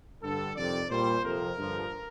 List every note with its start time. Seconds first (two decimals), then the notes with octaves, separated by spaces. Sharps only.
0.22 G2 D3 G3 A4
0.56 F2 C3 D#3 D5
0.90 A#2 G3 C5
1.24 F2 C3 F3 A#4
1.59 G2 D3 F3